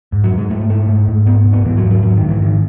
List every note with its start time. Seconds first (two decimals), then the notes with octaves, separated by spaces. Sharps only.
0.12 G#2
0.24 F#3
0.31 G#2
0.38 G#3
0.50 G#2 A3
0.69 G#2 A3
0.89 G#2
1.08 G#2
1.26 G#2 B3
1.45 G#2
1.53 B3
1.64 G#2 E3
1.77 F#3
1.83 G#2
1.91 F#3
2.03 G#2 F#3
2.16 D#3
2.22 G#2
2.29 E3
2.42 G#2 D#3